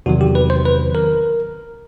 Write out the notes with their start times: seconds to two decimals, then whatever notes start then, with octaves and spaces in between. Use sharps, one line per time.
0.06 E2 C3 D#3 F#3 F#4
0.21 G4
0.35 B4
0.50 C5
0.65 B4
0.95 A#4